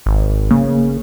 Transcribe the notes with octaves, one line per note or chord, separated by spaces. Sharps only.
G#1
C#3 A#3